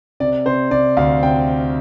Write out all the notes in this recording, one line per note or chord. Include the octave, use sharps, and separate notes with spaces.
C3 D5
C3 C5
C3 D5
D2 F5
C3 G5